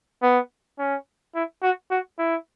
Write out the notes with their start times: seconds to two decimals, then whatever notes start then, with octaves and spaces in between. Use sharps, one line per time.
0.23 B3
0.79 C#4
1.35 E4
1.62 F#4
1.91 F#4
2.19 E4